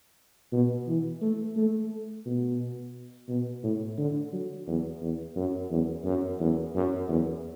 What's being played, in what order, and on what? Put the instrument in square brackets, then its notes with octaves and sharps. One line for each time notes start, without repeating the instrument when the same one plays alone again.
[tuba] B2
E3
A3
A3
B2
B2
A2
D3
F#3
E2
E2
F#2
E2
F#2
E2
F#2
E2